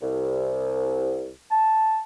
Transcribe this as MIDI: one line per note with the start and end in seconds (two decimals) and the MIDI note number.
0.02 1.33 36
1.51 2.01 81